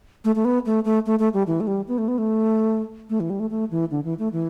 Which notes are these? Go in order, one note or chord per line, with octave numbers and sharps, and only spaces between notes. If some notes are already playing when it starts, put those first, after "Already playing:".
A3
A3
B3
A3
A3
A3
A3
G3
E3
A3
G3
B3
A3
B3
A3
A3
E3
G3
A3
A3
E3
D3
E3
A3
E3